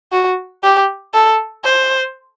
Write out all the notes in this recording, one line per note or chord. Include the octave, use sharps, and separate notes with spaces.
F#4
G4
A4
C5